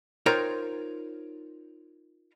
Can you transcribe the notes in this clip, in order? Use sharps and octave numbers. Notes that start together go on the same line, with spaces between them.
D#4 F4 A#4 C5 C#5 G5